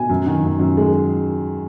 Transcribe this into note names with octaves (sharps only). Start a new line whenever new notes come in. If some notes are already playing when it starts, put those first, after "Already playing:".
Already playing: B2 G#5
F#2
D#3
F#2
F#2
G#3